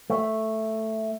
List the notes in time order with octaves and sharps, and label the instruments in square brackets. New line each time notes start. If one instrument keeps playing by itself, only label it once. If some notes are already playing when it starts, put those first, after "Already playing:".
[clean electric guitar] A3